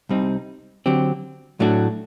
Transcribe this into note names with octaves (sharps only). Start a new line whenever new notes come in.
C2 C3 G3 C4 D#4
D3 F#3 C4 G4
A2 F#3 A3 D4 F#4